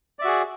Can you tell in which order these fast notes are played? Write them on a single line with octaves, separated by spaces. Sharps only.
D5 E5 F#4 G#4